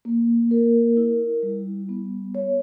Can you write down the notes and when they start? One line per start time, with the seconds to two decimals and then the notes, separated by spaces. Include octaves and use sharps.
0.05 A#3
0.51 A#4
0.97 E4
1.43 G3
1.89 B3
2.35 C#5